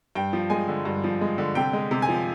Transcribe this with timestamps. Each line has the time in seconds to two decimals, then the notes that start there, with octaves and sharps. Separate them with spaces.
0.15 G2 G5
0.33 F3
0.50 G#3 G#5
0.68 D3
0.85 G2
1.04 F3
1.21 G#3
1.38 D3
1.55 C3 G5
1.73 G#3
1.91 C3
2.02 G#5
2.09 F3